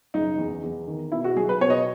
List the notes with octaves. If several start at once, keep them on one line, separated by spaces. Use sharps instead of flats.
F#1 D#4
E2
E2
D#3
B2 E4
F#4
B1 G#4
B4
B2 C#5
D#5